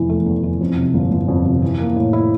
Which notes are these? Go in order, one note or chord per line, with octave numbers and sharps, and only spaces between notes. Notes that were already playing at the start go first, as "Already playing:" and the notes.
Already playing: F1 E2 E3
A3
E2
E3
F2
C3
G1
G1
F2
C3
E3
A#3
A2
E4